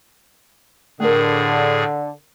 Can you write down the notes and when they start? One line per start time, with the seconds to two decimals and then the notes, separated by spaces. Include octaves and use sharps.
1.00 A2 D3 A3 G#4 A#4